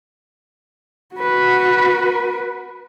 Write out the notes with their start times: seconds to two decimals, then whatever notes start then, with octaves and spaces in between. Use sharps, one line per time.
1.16 F#4 B4